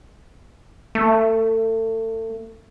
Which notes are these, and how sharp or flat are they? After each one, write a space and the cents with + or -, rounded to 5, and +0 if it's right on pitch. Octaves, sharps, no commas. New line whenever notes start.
A3 +30